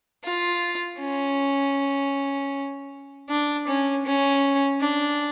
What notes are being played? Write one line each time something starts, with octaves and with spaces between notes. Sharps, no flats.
F4
C#4
D4
C#4
C#4
D4